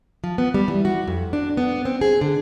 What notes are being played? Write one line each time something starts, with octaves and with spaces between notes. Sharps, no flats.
F3
B3
G3
E3
F#4
F2
D4
B3
C4
G#4
D3